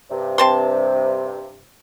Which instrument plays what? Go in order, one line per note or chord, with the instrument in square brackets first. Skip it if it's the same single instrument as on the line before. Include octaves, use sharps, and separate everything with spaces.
[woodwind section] G2 C3
[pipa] C4 A5 C6